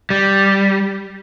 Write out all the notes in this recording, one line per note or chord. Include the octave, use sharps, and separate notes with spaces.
G3